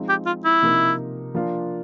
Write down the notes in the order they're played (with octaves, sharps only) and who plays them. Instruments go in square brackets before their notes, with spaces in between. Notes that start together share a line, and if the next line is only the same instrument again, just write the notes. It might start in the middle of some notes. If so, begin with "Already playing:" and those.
Already playing: [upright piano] F3 G#3 C4 D#4
[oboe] G4
F4
E4
[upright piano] C3 F3 A#3 D#4
F3 A#3 D4 F4